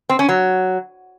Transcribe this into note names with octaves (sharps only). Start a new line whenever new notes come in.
C4
C#4
F#3